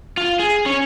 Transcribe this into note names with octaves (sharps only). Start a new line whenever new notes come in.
F4
G#4
C#4